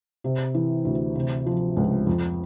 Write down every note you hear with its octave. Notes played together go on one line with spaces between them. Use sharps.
C3
E3
D2
C3
F3
C#2
F2